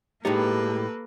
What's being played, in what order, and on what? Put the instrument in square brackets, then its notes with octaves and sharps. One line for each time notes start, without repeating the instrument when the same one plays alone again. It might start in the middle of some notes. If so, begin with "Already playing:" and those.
[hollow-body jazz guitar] A2 G#3 D#4 [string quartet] A#3 A4 B4 [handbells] G4